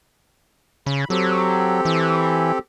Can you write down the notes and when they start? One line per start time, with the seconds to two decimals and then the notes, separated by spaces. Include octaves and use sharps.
0.86 C#3 B5
1.10 F#3 C4 G4 A4
1.85 E3